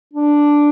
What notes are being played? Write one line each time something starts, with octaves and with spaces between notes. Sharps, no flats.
D4